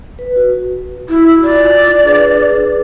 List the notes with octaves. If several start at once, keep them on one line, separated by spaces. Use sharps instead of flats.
B4
F#4
E4
F4 D5
D4 G#4 B4